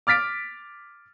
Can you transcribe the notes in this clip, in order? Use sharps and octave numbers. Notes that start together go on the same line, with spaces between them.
D6 F6 A6 B6 D7